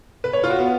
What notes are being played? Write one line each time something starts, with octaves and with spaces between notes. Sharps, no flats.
B4
C#5
F4
F#4
B3